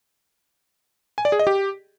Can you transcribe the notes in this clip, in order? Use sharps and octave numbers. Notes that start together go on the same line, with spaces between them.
G#5
D5
G#4
D#5
G4